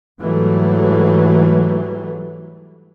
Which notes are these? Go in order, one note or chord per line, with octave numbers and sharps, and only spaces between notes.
G#2 E3 F#3 G3 A3